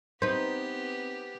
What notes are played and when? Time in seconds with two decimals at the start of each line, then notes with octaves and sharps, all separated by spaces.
0.22 B3 C4 D#4 G4 B4 C5